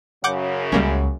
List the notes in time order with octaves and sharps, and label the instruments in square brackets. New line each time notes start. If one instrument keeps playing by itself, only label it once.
[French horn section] F#2 C#3 [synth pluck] F#5 D6 G6
[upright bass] C#2 [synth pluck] G3 A#3 C#4